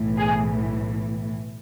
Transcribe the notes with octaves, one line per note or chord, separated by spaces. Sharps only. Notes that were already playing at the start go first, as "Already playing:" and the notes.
Already playing: B1 A2 E3
G#4